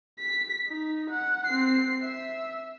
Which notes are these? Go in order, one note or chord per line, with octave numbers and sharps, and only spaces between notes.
B6
D#4
F#5
C4 C7
E5